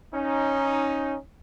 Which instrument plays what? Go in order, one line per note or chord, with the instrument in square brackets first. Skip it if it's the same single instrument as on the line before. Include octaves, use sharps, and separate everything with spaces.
[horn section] C#4 D#4